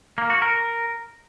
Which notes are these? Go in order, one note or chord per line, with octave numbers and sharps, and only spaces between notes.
A#3
F#4
A#4